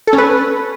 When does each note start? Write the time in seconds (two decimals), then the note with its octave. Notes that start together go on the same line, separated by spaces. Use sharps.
0.07 A4
0.13 C#4
0.18 B4